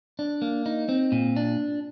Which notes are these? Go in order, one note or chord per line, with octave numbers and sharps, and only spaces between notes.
D4
A#3
D#4
C4
A#2
D4